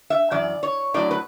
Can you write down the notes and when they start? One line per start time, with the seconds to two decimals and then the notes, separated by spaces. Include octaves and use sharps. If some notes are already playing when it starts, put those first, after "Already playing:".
0.10 E5
0.31 F#2 E3 D5
0.63 C#5
0.94 A2 F#3 D5
1.11 B4